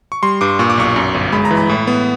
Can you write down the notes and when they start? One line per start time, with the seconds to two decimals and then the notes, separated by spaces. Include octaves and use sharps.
0.12 C#6
0.23 G3 C6
0.41 G2 D6
0.59 A#2 C#6
0.70 D6
0.78 B1 C#6
0.96 F#2
1.14 G1
1.32 G#3 B5
1.45 A#5
1.51 E3
1.57 B5
1.69 A2
1.87 B3